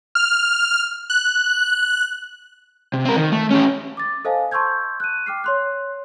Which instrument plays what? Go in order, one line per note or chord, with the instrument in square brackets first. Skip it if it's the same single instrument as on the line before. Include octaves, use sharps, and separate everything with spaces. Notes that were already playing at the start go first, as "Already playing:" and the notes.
[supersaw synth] F6
F#6
[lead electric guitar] C3
C4 A#4
D#3
A3
C#4 G4
[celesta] D6 A6
A4 C5 D#5 F5 G#5 A5
A5 C6 C#6 E6 G6 G#6
F#6 D#7
G5 D6 F6 C7
C#5 C6 F#6